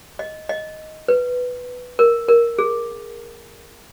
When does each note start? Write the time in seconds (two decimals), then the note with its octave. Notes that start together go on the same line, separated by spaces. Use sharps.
0.19 D#5
0.49 D#5
1.08 B4
1.99 A#4
2.28 A#4
2.59 G#4